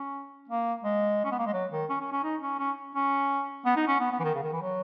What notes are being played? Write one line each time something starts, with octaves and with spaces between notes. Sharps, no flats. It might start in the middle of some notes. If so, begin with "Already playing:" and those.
Already playing: C#4
A#3
G#3
C#4
B3
A#3
G#3
F#3
D#3
C#4
C#4
C#4
D#4
C#4
C#4
C#4
B3
D#4
C#4
B3
B3
E3
D#3
C#3
D#3
E3
F#3